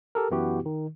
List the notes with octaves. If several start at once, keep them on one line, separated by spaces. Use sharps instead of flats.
G4 A4 A#4
F#2 E3 B3 E4 F#4 G4
D#3